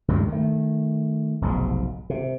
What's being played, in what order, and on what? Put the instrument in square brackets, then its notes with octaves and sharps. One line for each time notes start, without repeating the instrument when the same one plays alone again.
[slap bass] D2 G2 D#3 G#3
D#3 A3
F1 B1 G#2
C3